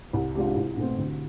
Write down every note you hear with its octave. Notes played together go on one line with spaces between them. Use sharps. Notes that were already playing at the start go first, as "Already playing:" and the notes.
C2
C3 G#3 D4 F4
C2
B2 A3 C4
D2